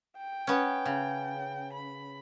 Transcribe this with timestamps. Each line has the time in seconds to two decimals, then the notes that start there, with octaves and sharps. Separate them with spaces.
0.18 G5
0.47 B3 C#4
0.85 C#3
1.73 B5